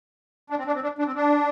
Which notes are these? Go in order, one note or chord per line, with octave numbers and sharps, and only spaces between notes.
D4
C4
D4
C4
D4
D4
C4
D4